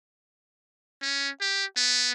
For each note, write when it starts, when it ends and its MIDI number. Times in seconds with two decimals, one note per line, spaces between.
1.02 1.29 61
1.41 1.65 67
1.77 2.11 59